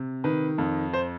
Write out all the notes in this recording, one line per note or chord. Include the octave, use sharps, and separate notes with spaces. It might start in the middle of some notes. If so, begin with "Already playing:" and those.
Already playing: C3
D#3 B4
F2
C5